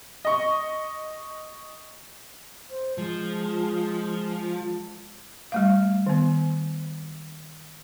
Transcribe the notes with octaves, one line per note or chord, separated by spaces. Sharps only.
D#5 C#6
C5
F3 G#3
G3 A3 F5
D#3 B3